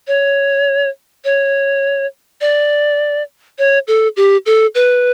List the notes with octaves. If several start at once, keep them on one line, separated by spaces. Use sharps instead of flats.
C#5
C#5
D5
C#5
A4
G4
A4
B4